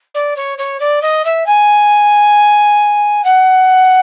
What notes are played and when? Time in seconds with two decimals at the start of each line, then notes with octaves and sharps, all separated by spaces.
0.15 D5
0.36 C#5
0.58 C#5
0.80 D5
1.02 D#5
1.25 E5
1.46 G#5
3.24 F#5